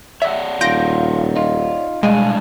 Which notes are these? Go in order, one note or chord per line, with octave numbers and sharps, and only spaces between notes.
C#5 D5 E5 F#5
D#1 F4 G6 A#6 D7
D#4 F4
B1 A2 G3 G#3 D4 F5 G#5